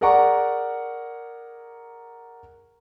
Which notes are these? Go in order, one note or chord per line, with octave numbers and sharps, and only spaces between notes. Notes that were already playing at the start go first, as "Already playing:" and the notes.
G#4 A#4 D5 F#5 A#5 C#6